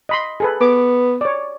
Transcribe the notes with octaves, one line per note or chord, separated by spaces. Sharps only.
D#5 B5 C6
G#4 A4 B4
B3 D6
C#5 D5